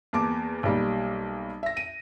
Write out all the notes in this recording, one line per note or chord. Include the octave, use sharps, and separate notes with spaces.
E2 A#3 A5 D6
B1 G3 A#3
E5 A#6
D#7